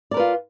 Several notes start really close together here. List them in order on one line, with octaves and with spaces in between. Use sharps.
D5 A#4 B4 F4